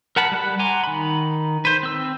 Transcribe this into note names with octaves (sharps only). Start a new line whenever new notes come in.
A#4 F#5 A5 B5
G3 F#5 B5
F#5 G#5 A#5 C6 D6
D#3 B5
B4 C5
C4 E6